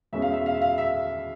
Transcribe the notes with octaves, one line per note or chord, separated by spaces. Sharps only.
E2 B2 G#3 C#4 E5
F5
E5
F5
E5
F5
E5